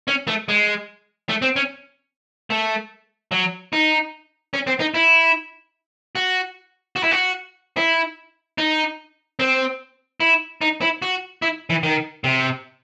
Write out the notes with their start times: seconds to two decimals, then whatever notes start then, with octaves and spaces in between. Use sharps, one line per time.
0.08 C#4
0.27 A3
0.48 G#3
1.29 A3
1.42 C4
1.56 C#4
2.50 A3
3.32 F#3
3.73 D#4
4.54 C#4
4.67 C4
4.80 D#4
4.94 E4
6.15 F#4
6.96 F#4
7.03 E4
7.11 F#4
7.77 E4
8.58 D#4
9.39 C4
10.20 E4
10.61 D#4
10.82 E4
11.02 F#4
11.42 E4
11.70 E3
11.83 D#3
12.24 C3